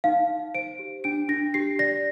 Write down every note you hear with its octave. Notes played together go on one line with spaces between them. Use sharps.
D#4 F5
D#4
C5 D7
G4
D4 D7
D4 A#6
G4 C7
D5 A#6